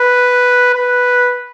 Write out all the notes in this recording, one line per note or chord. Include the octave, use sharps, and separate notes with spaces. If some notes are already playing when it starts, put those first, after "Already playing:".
Already playing: B4
B4